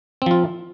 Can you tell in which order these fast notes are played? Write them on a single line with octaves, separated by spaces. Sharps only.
C4 F3 F4